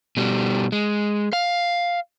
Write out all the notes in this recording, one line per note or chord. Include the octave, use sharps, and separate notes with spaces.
B2 G3
G#3
F5